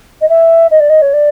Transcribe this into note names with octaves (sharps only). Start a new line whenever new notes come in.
D#5
E5
D#5
D5
D#5
C#5
D5